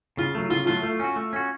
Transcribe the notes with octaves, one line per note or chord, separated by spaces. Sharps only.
C#3 F4
F#3 A3
C#3 F4
F#3 A3 F4
A3
C#4 F#4
A3
C#4 F#4